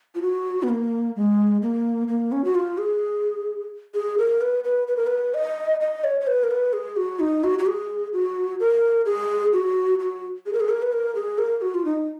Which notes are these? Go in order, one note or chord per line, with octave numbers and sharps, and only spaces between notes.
F4
F#4
B3
A#3
G#3
A#3
A#3
C#4
F#4
F4
G#4
G#4
A#4
B4
B4
B4
A#4
B4
D#5
D#5
C#5
C#5
B4
A#4
B4
G#4
F#4
D#4
F#4
F#4
G#4
F#4
A#4
G#4
F#4
F#4
G#4
A#4
G#4
A#4
B4
A#4
G#4
A#4
F#4
F4
D#4